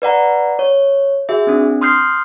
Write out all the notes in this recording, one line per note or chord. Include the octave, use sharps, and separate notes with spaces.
B4 D5 F#5 A#5
C#5
F#4 G#4 E5
C4 D4
C6 D#6 F6 G6 C7